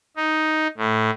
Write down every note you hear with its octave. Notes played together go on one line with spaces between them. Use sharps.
D#4
A2